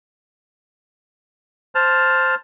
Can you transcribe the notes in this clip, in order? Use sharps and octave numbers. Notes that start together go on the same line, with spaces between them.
C5 A5 F6